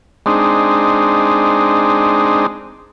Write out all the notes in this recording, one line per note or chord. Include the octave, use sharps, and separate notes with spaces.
G#3 C4 D4 D#4